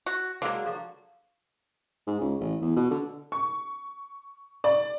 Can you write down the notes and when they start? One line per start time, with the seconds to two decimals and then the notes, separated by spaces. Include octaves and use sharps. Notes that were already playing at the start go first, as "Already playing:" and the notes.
0.06 F#4
0.42 D3 F#3 G#3 A#3
0.66 F3 F#4
2.07 G#2
2.21 C#2
2.40 A1
2.61 E2
2.76 B2
2.91 D3
3.32 C#6
4.64 D5